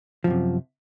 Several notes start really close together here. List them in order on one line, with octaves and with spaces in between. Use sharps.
F3 F#2 C3